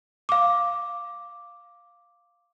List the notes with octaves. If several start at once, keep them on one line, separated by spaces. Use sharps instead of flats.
F5 D6